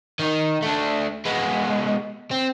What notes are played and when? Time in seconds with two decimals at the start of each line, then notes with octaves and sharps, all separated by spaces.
0.19 D#3 D#4
0.63 A3 D4
1.25 G#3 B3
2.31 C4